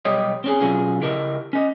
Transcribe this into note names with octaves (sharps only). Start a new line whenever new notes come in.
B1 G3 G4 C#5 D#5
C4 C#4 G#4
B2 F#3 C#4 F4 G#4
C#3 E4 G4 A#4 D#5 A5
C#4 D#5